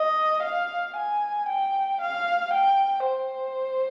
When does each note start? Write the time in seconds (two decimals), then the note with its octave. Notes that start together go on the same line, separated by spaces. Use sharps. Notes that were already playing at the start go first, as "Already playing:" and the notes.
Already playing: D#5
0.43 F5
0.97 G#5
1.49 G5
2.01 F5
2.54 G5
3.07 C5